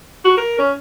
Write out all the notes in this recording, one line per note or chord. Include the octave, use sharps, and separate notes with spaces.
F#4
A#4
C#4